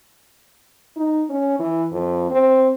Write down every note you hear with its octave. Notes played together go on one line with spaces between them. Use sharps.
D#4
C#4
E3
F2
C4